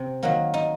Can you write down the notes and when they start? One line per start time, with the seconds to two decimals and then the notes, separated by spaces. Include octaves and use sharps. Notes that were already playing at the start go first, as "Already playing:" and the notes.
Already playing: C3
0.23 D#3 F#3 A#3
0.54 D#4